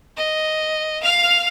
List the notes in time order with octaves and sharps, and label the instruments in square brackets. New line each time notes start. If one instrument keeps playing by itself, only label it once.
[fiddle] D#5
F5 F6